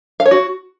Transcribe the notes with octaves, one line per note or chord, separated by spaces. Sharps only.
F5
C#5
F#4